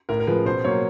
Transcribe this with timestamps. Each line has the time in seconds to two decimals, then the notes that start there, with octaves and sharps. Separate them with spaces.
0.09 A2 A#4
0.20 A#4
0.27 F3 G#3 B4
0.45 B2 C5
0.64 F#3 A#3 C#5